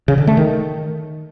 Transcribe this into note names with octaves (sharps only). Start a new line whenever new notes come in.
C#3
D3
A3
D#3